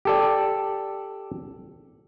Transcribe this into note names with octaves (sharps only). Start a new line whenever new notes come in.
G4 A4 D5